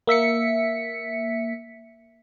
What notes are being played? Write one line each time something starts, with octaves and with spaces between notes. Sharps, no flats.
A#3 E5 B6 C#7